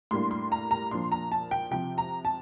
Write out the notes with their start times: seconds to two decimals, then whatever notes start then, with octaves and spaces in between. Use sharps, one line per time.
0.11 A2 G3 A#3 D4 C6
0.31 C6
0.52 A#5
0.71 A#5
0.91 A#2 F3 A#3 D4 C6
1.12 A#5
1.32 A5
1.51 G5
1.71 C3 F3 C4 G5
1.98 A#5
2.25 A5